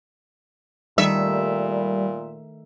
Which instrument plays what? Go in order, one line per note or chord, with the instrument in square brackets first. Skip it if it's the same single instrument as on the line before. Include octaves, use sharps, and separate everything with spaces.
[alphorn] A#2 [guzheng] D#3 A3 [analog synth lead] G3 [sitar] E5